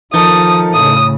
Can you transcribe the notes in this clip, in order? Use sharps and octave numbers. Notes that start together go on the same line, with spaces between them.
D#3 F3 D#4 A4 A#4 D#6
A2 C#3 D#6